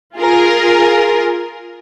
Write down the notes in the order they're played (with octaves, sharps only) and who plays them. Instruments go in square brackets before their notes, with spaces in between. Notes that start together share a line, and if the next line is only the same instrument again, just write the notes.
[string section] F4 G#4 A#4